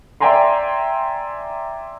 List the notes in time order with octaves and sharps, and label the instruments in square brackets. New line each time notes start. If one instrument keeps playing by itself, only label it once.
[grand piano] D5 E5 G5 G#5 A#5 C6